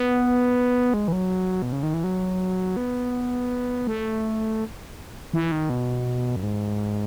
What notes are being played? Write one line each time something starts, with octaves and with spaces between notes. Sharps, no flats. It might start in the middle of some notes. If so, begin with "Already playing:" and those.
Already playing: B3
G#3
E3
F#3
B2
C#3
D#3
E3
F#3
B3
A3
E3
D#3
B2
F#2
G#2